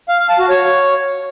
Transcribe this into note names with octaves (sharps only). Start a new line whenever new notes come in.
F5
F5
A5
F#4
C#5